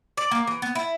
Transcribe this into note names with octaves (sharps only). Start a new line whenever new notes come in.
D5
A#3
E3
B3
E4